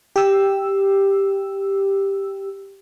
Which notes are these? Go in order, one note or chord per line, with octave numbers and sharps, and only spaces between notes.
G4 E6